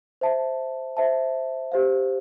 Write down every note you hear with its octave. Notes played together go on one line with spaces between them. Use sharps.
C5 E5 A5
C5 E5 A5
G4 C5 F5